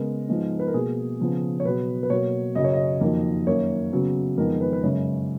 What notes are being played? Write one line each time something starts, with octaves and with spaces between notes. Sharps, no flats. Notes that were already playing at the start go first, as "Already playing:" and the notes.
Already playing: C#3 G#3 B3 A#4
G#2 F3 G#3 B3
B4
A#4
B2 A#3 G#4
C#3 F3 B3
C#5
B2 F#3 B3 B4
B4
B2 F#3 A#3 C#5
F#2 C#3 F#3 D#5
C#5
D#5
F2 D#3 F#3 A#3
F#2 D#3 A#3 C#5
C#3 F#3 B3
F2 D#3 G#3 B3 A#4
B4
B4
F#2 C#3 G#3 C#5